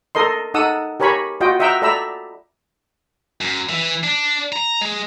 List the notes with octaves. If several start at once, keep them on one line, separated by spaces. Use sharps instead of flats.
A4 A#4 D#5 C6
D#4 A4 F#5 D#6 E6
G4 A#4 C#5 G#5 B5 C#6
F4 F#4 D#5 G5
D#5 E5 F#5 G5 A#5 E6
A4 D5 E5 A#5 B5 E6
F#2
E3
D4
A#5
G#3